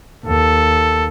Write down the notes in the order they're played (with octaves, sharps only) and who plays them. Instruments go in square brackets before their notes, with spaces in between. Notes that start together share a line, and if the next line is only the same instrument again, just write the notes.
[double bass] D#2 [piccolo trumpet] A4